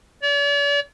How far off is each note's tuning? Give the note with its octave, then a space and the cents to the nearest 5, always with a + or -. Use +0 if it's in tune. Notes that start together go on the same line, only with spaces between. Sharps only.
D5 -45